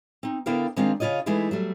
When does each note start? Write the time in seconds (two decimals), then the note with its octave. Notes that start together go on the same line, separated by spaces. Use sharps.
0.23 C4 D#4
0.46 D3 B3 E4 A#4 F5 G5
0.76 D#3 G#3 C4 D4 F4
1.00 C#3 F3 F4 C#5 D#5
1.26 E3 G#3 A3 D#4 E4
1.51 F#3 G3 A3